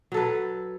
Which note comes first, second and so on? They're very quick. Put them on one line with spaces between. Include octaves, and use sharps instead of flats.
F#3 A4 B4